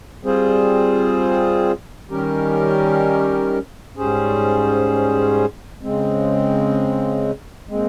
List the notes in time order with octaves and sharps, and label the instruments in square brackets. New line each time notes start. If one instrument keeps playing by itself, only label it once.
[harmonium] G3 C4 F4 G#4 C5
D#3 G3 C#4 G4 A#4
G#2 G3 C#4 G#4 C5
C#3 G#3 C4
A#2 G#3 C4